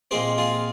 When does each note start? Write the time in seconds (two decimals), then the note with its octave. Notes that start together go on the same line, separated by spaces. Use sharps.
0.11 A#2 G#3 C4 G#4 C5
0.38 F4 G#4